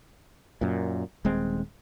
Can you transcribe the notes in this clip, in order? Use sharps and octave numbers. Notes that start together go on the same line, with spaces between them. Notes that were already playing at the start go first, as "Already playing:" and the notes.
F#2 A#2
D#1 G#3 C4